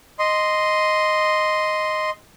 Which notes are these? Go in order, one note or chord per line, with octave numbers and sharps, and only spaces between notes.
D#5 C6